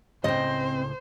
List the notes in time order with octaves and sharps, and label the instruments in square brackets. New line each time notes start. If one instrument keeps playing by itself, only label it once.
[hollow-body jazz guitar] C#2 A2 C#3 [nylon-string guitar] C4 D#5 [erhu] C5